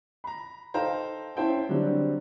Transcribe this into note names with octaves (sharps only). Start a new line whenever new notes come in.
A#5 B5
D#4 A4 C5 F5 G5 A#5
C#4 E4 C5 G5 A5
D3 F#3 G3 C4 D4